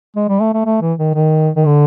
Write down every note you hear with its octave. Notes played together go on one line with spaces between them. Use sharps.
G#3
G3
A3
A3
A3
E3
D#3
D#3
D#3
D3